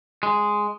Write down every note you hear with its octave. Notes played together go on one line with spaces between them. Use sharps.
G#3